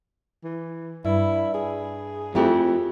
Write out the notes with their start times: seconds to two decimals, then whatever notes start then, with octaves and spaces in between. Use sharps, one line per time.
0.44 E3
1.05 G2 E4
1.54 G#4
2.35 F2 A3 E4 G4